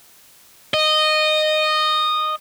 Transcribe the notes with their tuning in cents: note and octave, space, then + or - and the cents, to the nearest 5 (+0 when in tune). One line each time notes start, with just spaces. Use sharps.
D#5 -15